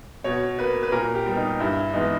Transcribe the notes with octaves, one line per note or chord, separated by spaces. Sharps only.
B2 C#5
A#3 B4
B4
A#2 A#4
G4
G3 B3
D#4
G2 E4
E3 G#3 B3 D#4